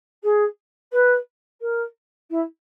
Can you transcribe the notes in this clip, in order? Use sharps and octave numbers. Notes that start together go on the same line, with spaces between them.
G#4
B4
A#4
E4